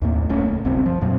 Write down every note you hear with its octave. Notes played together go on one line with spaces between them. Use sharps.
D#2 A2 A#3
D1 A3 C#4
C#2
F#1 C2 B2 C4
F3
F2 A#2 F#3 C4